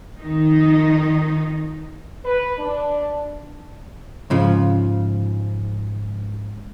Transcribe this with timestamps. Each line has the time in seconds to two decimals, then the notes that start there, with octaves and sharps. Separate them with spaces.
0.20 F2 D#3 D#4
2.24 B4
2.59 D4
4.30 G#2 C#3 F3